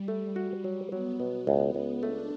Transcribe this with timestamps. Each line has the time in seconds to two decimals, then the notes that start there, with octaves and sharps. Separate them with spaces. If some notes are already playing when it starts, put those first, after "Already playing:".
Already playing: G3
0.08 A3
0.36 F#4
0.64 F#3
0.91 F#3 B3
1.20 B2
1.47 C#2
1.75 C#2
2.03 A3 D4